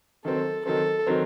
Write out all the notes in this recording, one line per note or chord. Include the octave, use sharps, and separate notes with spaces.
D#3 F#3 C4 A4
D#3 F#3 C4 A4
D#3 F#3 C4